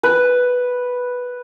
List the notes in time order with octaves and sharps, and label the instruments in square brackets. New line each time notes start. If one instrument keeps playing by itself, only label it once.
[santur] B4